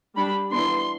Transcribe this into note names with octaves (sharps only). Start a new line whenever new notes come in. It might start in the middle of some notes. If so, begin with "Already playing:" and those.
G3 D4 B5
E3 B3 D4 C6